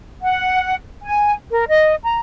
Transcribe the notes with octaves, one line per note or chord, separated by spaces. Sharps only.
F#5
G#5
A#4
D#5
A#5